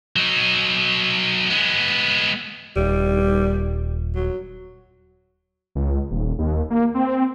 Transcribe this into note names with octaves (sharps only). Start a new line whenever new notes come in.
F#3 D#4
G#3 B3
D#1 G3
F#3
C#2
D#1
D#2
A#3
C4